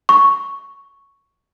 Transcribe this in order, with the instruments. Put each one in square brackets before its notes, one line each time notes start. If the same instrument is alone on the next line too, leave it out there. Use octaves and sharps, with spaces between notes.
[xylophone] C#6